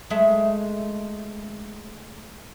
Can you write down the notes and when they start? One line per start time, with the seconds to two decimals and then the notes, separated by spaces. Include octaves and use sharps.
0.10 G#3 A3 E5